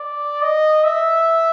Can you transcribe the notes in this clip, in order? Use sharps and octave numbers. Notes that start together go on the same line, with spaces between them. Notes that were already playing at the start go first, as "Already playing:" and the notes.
Already playing: D5
D#5
E5